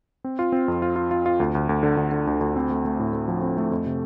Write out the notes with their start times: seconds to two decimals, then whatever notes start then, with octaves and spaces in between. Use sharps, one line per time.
0.24 C4
0.39 F4
0.52 C4
0.68 F2
0.82 F4
0.96 F4
1.11 F4
1.26 F4
1.40 D2
1.55 D2
1.69 D2
1.83 D3
1.97 D2
2.11 D3
2.27 D2
2.41 D2
2.56 C4
2.71 A3
2.85 A3
2.99 A2
3.13 A3
3.28 F3
3.42 C4
3.57 A3
3.72 F2
3.86 C3